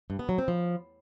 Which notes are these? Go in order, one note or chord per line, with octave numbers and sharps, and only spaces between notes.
G2
B3
F#3
C4
F3